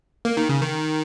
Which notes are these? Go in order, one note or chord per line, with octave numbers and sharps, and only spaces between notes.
A#3
D#3
C#3
D#3